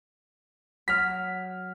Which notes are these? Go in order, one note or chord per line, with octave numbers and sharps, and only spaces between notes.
F#3 F6 B6